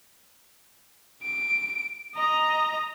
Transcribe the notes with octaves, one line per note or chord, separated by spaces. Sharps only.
D7
D#5 A#5